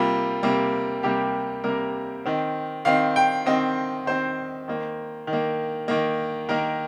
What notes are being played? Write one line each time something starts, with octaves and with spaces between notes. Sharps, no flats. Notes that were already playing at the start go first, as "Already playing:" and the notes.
Already playing: C3 G3 A#3 F4
C3 G3 A#3
C3 G3 A#3 G4
C3 G3 A#3 A#4
D#3 C4
D#3 C4 F5
G5
D#3 C4 D#5
D#3 C4 C5
D#3 A#3
D#3
A#3
D#3 A#3
D#3 A#3 A#4